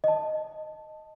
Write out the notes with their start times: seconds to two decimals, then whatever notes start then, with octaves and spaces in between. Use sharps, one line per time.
0.04 D#5 A5